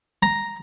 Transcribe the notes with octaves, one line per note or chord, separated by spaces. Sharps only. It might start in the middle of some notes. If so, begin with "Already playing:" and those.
A#5